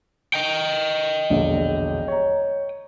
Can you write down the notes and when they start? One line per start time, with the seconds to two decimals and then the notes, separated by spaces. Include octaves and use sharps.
0.34 D#5 G5
1.30 E1 A#1 D3
2.08 C#5 A#5